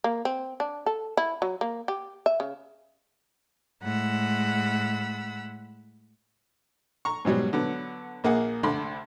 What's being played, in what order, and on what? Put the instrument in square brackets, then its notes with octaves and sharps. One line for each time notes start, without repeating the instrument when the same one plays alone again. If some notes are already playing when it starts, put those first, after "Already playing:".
[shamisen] A#3
C4
D4
A4
E4
F#3
A#3
G4
E5
C#3
[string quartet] A2 G#3 F#5 B5 E6
[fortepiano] A#5 C#6
G#2 B2 F#3 G3
D3 F#3 B3
A#1 A#3 G#4 F#5
C2 D3 A3 B5 C6